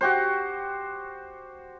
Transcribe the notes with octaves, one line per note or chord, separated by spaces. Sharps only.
F#4 G4 C5